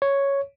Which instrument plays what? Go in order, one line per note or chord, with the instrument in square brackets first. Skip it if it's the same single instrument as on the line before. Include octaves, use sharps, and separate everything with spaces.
[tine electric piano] C#5